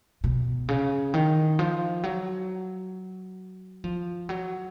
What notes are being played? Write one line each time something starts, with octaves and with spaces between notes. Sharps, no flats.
B2
C#3
D#3
F3
F#3
F3
F#3